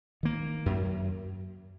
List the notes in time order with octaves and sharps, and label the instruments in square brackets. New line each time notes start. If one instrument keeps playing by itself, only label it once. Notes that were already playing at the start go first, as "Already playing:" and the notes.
[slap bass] D#3 A#3
F#2